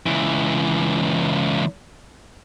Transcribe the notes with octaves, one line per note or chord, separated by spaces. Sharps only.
C#2 E3